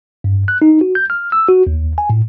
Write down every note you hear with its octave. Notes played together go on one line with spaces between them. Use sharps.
G2
F#6
D#4
F#4
G6
F6
E6
F#4
D#2
G#5
A2